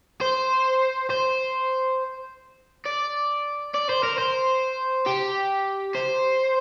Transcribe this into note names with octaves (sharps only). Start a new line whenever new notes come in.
C5
C5
D5
D5
C5
A#4
C5
G4
C5